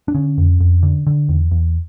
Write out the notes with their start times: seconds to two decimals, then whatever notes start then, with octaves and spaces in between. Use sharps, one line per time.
0.08 D4
0.15 D3 C#4
0.38 F2
0.60 F2
0.83 D3
1.07 D3
1.29 E2
1.51 E2